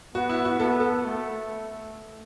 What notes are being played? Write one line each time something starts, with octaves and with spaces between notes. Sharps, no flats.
B3 F#4
E4
F#4
B3 A4
A4
A3